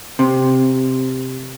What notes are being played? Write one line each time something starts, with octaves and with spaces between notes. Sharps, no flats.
C3